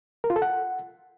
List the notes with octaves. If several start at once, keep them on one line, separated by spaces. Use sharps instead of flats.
A#4
F4
A4
F#5